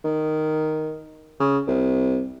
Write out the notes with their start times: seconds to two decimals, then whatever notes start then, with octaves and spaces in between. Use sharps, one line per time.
0.05 D#3
1.40 C#3
1.67 C2